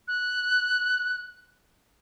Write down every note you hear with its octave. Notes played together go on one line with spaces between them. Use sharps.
F#6